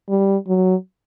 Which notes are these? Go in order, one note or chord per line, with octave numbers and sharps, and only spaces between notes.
G3
F#3